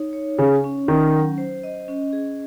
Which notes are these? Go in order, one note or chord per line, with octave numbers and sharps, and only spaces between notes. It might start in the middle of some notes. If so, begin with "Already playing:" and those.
Already playing: D#4 C#5
C#5
C#3 C#4
C#4
D#3 C#4
F#3
C5
D#5
C#4
G#4